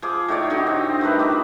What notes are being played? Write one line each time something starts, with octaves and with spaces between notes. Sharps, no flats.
F3 G#4 D6
A2 D#4 C#5 D5
D3 F#3 D#4 G4
C4
D#3 G3 A3 B4
F3 D#5 D6